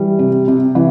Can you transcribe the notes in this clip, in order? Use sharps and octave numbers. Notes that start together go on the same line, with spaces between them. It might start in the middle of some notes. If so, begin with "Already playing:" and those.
Already playing: E3 G3
C3
C3
E3